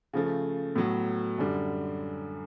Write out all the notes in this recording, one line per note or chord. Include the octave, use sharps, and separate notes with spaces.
C#3 F3 A3
A2 F#3 B3
F#2 D3 G3